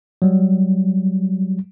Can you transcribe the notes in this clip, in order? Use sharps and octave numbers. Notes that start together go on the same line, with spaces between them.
F#3 G3